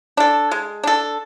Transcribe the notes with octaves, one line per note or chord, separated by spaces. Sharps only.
D4 A4
G#3
D4 A4